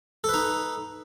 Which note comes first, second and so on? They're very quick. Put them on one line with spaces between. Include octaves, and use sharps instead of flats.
A4 B4 D#4